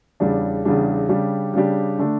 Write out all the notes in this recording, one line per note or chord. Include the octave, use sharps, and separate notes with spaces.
E2 C#3 G3 D4
E2 C#3 G3 D4
C#3 G3 D4 G4
C#3 G3 D4 G4
D3 A3 D4